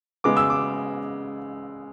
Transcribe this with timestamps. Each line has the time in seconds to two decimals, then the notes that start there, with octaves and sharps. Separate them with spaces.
0.24 C#3 G#3 B3 D6
0.37 E6
0.50 D6